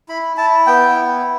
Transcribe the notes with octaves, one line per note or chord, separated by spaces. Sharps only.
E4 B5
E4 A5
B3 G5
E4